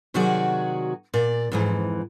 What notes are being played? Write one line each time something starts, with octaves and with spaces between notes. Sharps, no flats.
C3 D#3 F#3 F#4 G#4 D5
A#2 D5
F2 G#2 E3